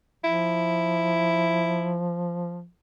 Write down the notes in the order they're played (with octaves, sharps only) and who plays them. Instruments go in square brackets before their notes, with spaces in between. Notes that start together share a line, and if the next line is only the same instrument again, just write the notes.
[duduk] F3 [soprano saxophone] E4